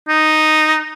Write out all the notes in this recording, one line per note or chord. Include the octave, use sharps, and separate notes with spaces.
D#4